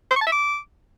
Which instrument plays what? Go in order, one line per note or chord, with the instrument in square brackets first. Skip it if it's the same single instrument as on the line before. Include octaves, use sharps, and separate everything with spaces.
[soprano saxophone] C5
C#6
A5
E5
D6